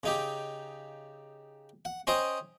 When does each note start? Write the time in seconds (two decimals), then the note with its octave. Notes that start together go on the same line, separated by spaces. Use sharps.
0.03 C#3 D#4 G4
1.85 F#5
2.07 C#4 C5 D#5 G5 D#6